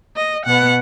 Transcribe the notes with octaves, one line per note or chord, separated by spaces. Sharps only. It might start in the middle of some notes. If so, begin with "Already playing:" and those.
D#5
B2 B3 F#5